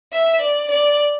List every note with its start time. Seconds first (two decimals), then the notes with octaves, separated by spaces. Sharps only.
0.13 E5
0.42 D5
0.71 D5